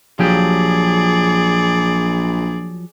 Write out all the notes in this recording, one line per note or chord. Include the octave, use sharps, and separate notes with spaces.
A#1 F3 F#3 G4 G#4 D5